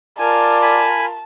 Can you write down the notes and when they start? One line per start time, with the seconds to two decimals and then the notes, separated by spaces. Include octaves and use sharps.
0.19 F4 A#4 D5 G#5 A5
0.62 G#5 B5